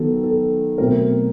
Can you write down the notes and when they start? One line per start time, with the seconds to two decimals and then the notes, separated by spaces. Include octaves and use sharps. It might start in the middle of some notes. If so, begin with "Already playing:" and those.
Already playing: D#3 F#3 B3 A4
0.24 A4
0.78 B2 F#3 A3 C4 A#4